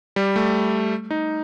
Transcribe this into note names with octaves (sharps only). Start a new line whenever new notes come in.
G3
A3
D#4